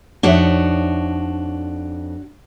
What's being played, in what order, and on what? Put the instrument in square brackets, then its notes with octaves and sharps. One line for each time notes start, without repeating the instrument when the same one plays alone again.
[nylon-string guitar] F2 D#4 E5 [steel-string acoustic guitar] D4 F#4 C#5